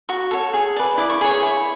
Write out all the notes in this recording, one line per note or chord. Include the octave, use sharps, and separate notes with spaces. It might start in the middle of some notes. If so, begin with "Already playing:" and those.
F#4 C#6
A4 C#5
G#4
B4 D5
E4 D6
C#6
G#4 C#5
C#6
E4